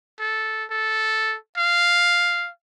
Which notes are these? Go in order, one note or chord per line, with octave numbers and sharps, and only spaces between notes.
A4
A4
F5